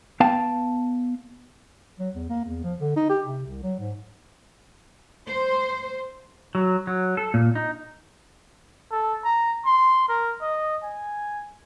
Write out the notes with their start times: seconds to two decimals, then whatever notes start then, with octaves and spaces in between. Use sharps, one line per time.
0.20 B3 F5 G5 A5
1.99 F#3
2.15 E2
2.30 A#3
2.45 E2
2.63 F3
2.80 D3
2.96 D#4
3.09 G4
3.26 C3
3.46 C2
3.63 F#3
3.79 G#2
5.28 C5
6.55 F#3
6.87 F#3
7.17 A4
7.34 A#2
7.55 D#4
8.91 A4
9.24 A#5
9.65 C6
10.08 A#4
10.41 D#5
10.83 G#5